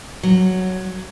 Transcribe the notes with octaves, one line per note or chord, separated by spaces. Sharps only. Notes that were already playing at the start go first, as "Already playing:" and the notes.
F#3